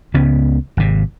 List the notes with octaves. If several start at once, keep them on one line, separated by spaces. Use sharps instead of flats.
C#2 C#3 B3 C#4
G#1 C3